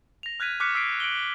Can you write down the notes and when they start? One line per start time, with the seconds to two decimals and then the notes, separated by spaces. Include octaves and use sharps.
0.23 A#6 F7
0.40 F6 F#6 G#6 B6 D#7
0.60 C#6 D6 F6 F#6 B6 C#7
0.75 E6 B6 C7 D7
1.00 D7 F#7 G7